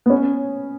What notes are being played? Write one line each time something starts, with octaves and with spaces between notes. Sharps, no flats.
B3
C#4